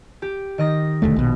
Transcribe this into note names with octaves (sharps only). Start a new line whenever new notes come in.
G4
D#3 D#5 A#6
E1 D2 A3
A#1 B2